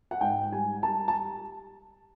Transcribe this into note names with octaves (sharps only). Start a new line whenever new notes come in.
F#5
G#2 G5
G3 G#5
G3 A5
A5